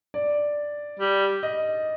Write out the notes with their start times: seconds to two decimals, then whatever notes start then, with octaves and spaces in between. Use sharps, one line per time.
0.14 D5
0.99 G3
1.43 D#5